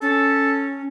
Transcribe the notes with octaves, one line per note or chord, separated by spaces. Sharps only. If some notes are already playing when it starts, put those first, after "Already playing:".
C#4 A4